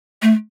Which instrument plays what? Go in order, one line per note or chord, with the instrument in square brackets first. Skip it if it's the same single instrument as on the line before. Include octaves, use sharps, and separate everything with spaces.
[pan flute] A3